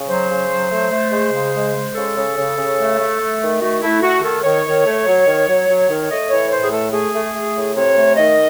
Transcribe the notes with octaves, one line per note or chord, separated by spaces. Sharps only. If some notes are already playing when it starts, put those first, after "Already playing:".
Already playing: C#3
F#3 C5
C#3
F#3
A3
A3
G#3
C#3
G#3
G#3
C#3 A4
C#3
C#3
C#3
A3
A3
A3
D#3
A3 F#4
A3 E4
A3 F#4
D#3 A4
D#3 C#5
D#3
A3
F#3
D#3
F#3
F#3
D#3
A3 D#5
E3 C#5
A2 C5
G#4
A3 A4
A3 G#4
A3
A3
A2
C3 C#5
A3
D#3 D#5